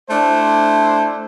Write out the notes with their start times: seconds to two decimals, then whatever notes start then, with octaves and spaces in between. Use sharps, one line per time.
0.10 A3 D4 E4 C5